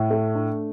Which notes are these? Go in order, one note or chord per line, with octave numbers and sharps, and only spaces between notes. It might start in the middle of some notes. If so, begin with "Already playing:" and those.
Already playing: A2
A3
D4